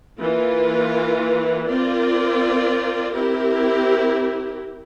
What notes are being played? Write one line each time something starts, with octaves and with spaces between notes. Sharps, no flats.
E3 A#3 F4
C4 F4 A#4 D5
C4 E4 G4 A#4